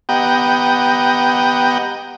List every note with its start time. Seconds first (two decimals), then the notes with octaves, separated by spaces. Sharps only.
0.09 B3 G4 D#5 F#5 G5 A#5